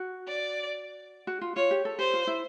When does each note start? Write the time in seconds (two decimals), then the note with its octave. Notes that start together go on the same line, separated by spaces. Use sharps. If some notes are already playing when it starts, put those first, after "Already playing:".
Already playing: F#4
0.28 D5
1.27 F#4
1.41 F4
1.56 F4 C#5
1.71 G4
1.85 A4
1.99 G4 C5
2.14 F4
2.27 E4